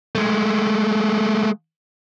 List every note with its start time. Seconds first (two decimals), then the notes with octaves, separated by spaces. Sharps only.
0.15 G#3 A3